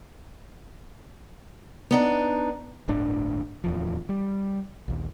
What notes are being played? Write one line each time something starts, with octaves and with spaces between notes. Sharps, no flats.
B3 D4 D#4
D1 G1 A2 D4
D1 E2 F3
G3
A#1 D#2